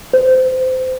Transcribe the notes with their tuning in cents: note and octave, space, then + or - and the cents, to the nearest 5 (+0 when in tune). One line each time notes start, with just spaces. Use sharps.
C5 -25